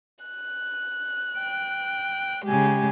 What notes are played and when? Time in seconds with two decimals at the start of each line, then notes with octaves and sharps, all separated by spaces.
0.25 F#6
1.39 G5
2.45 C#3 G#3 G4 G#5